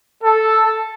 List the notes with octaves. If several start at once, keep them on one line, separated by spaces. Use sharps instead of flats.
A4